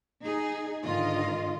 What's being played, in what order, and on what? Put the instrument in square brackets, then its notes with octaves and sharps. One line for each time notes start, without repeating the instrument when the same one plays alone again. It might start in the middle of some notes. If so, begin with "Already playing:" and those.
[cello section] D#4 G#4
G#2 D3 D#3 F4 D#5